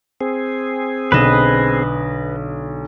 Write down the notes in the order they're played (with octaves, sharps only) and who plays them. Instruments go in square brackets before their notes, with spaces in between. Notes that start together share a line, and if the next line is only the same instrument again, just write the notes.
[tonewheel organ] C4 G#4
[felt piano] B1 D3 E7 [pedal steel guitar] B4 D#5